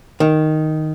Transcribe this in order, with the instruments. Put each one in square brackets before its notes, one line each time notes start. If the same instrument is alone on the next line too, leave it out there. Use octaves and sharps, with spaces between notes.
[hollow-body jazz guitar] D#3